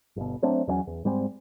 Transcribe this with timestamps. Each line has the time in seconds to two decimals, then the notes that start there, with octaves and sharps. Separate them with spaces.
0.16 G1 B2
0.42 F#3 A3 C4 D4
0.67 E2 G2 F#3 C#4
0.87 E2
1.05 G#2 G3 G#3 C4